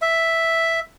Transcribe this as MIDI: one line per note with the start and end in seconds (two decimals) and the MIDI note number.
0.02 0.80 76